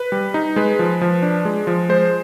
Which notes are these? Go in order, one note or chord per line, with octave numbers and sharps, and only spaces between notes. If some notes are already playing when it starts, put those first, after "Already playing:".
Already playing: B4
G3
D#4
G#3 B4
F3
F3
D4
G#3
F3
G#3 C5